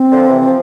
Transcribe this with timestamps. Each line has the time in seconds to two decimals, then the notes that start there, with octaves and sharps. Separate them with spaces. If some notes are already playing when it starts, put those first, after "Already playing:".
Already playing: C4
0.11 D3 F3
0.29 C3 E3
0.47 F3